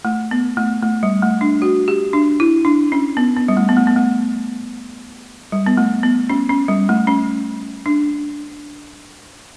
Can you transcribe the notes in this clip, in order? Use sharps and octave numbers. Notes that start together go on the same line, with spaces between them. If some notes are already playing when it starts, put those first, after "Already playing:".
A3
B3
A3
A3
G3
A3
D4
F#4
G4
D4
E4
D4
C#4
B3
B3
G3
A3
B3
A3
B3
A3
G3
B3
A3
B3
C#4
C#4
G3
A3
C#4
D4